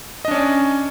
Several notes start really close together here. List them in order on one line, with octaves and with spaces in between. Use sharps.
D#5 D4 C#4 D5